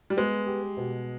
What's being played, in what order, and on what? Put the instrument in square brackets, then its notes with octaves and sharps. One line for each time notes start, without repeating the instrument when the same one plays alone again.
[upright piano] G3
[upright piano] G#3 [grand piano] B3
[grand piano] G4
B2